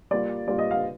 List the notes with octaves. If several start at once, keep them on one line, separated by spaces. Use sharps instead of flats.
G3 A#3 F4 D5
G3 A#3 F4 D5
D#5
F5